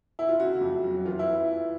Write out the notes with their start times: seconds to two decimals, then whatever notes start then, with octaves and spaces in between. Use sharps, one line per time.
0.19 E4
0.29 F4
0.39 C#3 F#4
0.61 F2
0.84 F#3
1.05 E3 F4
1.19 E4